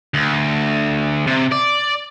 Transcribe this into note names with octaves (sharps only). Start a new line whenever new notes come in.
D2
C3
D5